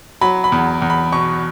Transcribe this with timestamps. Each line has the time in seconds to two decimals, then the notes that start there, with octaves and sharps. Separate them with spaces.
0.21 F#3 B5
0.44 B5
0.52 E2
0.82 E2
0.90 B5
1.12 B2 C#6